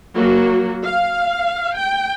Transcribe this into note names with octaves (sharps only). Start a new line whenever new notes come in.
F#3 A#3 F#4
F5
G5